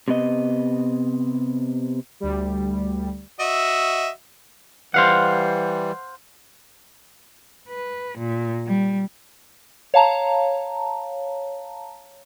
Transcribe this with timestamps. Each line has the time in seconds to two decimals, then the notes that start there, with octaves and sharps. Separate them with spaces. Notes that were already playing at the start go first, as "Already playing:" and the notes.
0.08 C3 B3 D#5
2.20 D2 G3
3.40 F#4 D#5 E5
4.94 E3 G3 C5 F5 F#5
7.69 B4
8.18 A#2
8.67 G3
9.94 C#5 F5 A5 A#5